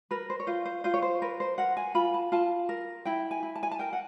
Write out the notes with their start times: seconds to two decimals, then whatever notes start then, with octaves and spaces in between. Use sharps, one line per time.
0.11 A#4 B4
0.30 C5
0.40 C#5
0.47 F4 C5
0.65 C5
0.84 F4 C5
0.94 C#5
1.02 C5
1.22 A#4 B4
1.40 C5
1.58 A#4 F#5
1.77 G#5
1.95 F4 B5
2.14 A5
2.32 F4 A5
2.69 A#4
3.05 E4 G5
3.31 G#5
3.43 E4
3.56 A5
3.63 G#5
3.71 A5
3.79 A#4 G5
3.93 F#5